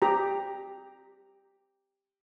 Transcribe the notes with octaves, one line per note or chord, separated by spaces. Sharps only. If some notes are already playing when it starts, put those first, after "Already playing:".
G4 A#5